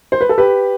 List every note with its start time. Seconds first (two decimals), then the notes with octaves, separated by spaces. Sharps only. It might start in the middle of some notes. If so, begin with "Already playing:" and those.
0.12 C5
0.21 B4
0.29 A4
0.38 G4 B4